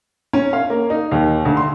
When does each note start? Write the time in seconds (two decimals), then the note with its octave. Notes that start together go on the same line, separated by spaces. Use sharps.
0.33 C#4
0.53 F5
0.70 A#3
0.90 D#4
1.12 D#2
1.45 D2
1.57 C6